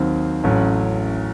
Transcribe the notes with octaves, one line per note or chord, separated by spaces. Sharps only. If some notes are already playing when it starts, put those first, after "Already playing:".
Already playing: D#2 D#3 F#3 C4
A1 A2 F#3 C#4